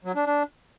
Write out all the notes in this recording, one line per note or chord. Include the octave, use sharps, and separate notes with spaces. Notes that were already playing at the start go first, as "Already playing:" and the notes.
F#3
D4
D4